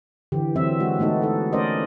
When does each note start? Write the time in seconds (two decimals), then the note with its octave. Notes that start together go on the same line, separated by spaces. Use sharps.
0.32 D3 E3 G4
0.56 E3 F#3 C4 E5
0.80 G#3 F#4
0.99 G#3 A3 B3 D#4 A4
1.22 D#4 A4
1.53 A3 C#4 A#4 C5 D5 D#5